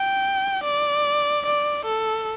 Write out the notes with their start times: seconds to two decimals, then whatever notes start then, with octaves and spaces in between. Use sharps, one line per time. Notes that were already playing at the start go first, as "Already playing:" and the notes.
Already playing: G5
0.64 D5
1.46 D5
1.86 A4